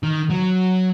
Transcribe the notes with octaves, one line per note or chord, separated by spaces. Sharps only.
D#3
F#3